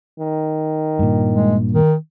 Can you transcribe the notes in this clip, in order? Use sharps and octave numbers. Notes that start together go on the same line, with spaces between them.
D#3
G2 A#2
G#3
D#3